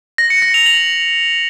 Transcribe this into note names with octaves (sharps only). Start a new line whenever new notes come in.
A#6
C#7
A#6
F7
F#7